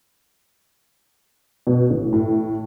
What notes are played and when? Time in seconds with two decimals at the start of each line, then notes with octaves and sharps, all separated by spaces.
1.67 B2
1.90 A1
2.13 A2